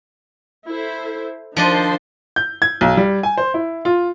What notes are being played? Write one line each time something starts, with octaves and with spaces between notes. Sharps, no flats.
E4 A4 C5
D#3 F3 D4 C5 D#5 C6
G6
G#6
B1
G3
G#5
C5
E4
F4